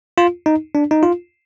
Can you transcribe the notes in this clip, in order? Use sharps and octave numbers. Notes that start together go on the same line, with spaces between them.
F4
D#4
D4
D#4
F4